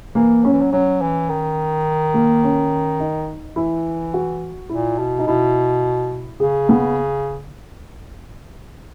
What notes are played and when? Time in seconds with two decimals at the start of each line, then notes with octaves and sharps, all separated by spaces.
0.15 E3 A#3
0.44 F#3 C#4
0.53 E3
0.61 F#3
0.72 F#3 C#4
1.01 E3
1.29 D#3
2.14 A#3
2.43 C#4
2.99 D#4
3.56 E3 E4
4.14 F#4
4.69 A#2 E4
4.99 B2
5.19 D#4
5.27 B2 E4
6.40 C#3 G#4
6.69 B3